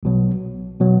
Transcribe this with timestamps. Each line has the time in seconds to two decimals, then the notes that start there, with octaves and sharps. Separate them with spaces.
0.03 B1 B2 F#3
0.80 B2 F#3